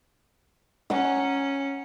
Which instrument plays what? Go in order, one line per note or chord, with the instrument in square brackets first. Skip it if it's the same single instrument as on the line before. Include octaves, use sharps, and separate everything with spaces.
[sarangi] C#4 [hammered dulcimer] F#5 A#5